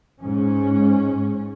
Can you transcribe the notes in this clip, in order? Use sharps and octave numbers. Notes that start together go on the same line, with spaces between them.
G#2 C#4